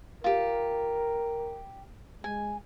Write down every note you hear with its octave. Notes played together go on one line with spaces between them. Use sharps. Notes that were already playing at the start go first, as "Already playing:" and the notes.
F4 G4 A#4
G#3 G#5